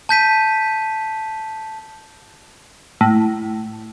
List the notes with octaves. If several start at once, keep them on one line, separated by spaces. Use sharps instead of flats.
A5 G6 B6 D#7
A2